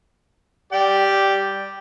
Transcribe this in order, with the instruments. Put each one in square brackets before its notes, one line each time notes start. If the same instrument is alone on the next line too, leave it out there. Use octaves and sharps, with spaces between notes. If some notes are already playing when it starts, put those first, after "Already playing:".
[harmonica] G4 D5 G5